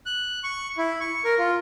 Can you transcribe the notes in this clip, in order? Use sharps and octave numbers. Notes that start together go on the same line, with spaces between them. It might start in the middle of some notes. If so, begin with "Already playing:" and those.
F#6
C#6
E4
C#6
A#4
F4